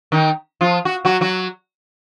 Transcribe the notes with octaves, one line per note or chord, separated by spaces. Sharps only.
D#3 D#4
F3 F4
F#4
F#3 F#4
F#3 F#4